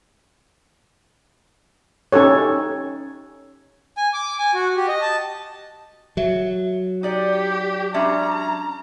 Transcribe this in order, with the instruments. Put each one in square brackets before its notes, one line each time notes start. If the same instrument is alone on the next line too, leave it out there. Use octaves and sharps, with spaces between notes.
[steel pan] C#4 D#4 G4 A4 C#5
[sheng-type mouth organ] G#5
D6
G#5
F#4
G4
D#5
A5
[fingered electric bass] F#3 [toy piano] E5
[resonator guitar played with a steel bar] D#4 D5 F#5 [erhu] G4
[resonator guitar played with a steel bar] G#3 C#4 D4 [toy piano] E5 B5 [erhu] A#5